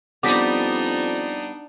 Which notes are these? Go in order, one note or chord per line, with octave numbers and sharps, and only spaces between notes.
F2 G3 B3 D4 D#4 D6 A#6 B6